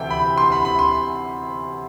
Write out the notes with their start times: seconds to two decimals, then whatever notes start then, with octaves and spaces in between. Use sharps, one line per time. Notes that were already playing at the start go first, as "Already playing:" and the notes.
Already playing: D2 C3 E3 G5
0.10 B5
0.38 C6
0.52 B5
0.65 B5
0.79 C6